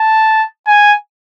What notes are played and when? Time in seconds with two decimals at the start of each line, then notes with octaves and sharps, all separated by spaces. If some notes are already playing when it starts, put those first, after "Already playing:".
Already playing: A5
0.67 G#5